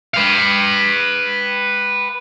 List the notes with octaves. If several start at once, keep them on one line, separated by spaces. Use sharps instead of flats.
B4 F5